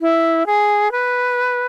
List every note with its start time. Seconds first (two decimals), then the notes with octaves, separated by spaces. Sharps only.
0.01 E4
0.46 G#4
0.92 B4